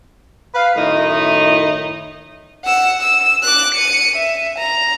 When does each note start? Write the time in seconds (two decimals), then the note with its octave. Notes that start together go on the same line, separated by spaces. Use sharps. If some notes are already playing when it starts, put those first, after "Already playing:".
0.55 B4 F5
0.76 F#2 A2 D#3 D#4 E4 D#5
2.65 F#5 E6
3.01 E6
3.43 D6 F#6
3.74 C#7 D#7
4.16 E5
4.58 A#5